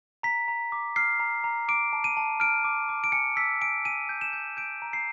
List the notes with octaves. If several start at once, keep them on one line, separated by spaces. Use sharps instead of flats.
A#5 B6
A#5
D6
F6 C7
A#5
A#5
D6 D7
A5
D#7
A5
F6 D7
D6
D6
D7
G#5 C#7
E6 B6
G#5 D7
G#5 D#7
G6
E7
G6
G6 D7
A#5
C7